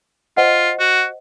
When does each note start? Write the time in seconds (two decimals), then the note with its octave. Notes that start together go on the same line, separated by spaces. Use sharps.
0.37 F4 C5 D#5 F#5
0.79 F#4